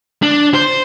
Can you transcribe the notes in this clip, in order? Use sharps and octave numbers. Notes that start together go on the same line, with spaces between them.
D4
C5